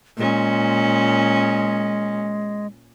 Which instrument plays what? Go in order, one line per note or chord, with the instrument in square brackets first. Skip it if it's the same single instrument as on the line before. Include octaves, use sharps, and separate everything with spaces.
[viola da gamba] A#2 C#4 [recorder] G#3